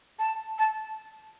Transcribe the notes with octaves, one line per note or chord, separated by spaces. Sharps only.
A5
A5